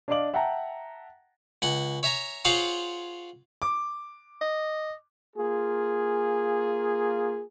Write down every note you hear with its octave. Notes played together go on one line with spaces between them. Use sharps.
D4 D5 D#5 F5 D6 F#7
E5 F#5 G5 A5 A#5
C#2 F#5 G#5
C#5 E5 G#5 A#5
F4 G#4 C5 C#5 F5 F#5
D6
D#5
A#3 F4 G#4